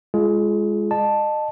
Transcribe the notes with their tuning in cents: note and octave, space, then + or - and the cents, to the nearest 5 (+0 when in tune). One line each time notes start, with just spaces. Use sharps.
G#3 -10 F4 -15 G#4 +30
D#5 -30 A5 +0